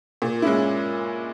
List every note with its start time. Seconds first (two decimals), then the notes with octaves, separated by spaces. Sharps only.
0.22 A#2
0.42 G#3 C#4 E4